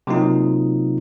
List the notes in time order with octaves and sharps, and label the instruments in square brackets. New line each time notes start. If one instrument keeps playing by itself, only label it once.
[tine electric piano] C3 F#3 A#3 D#4 F4